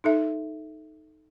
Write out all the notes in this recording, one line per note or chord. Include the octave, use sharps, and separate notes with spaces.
D#4 A4 E5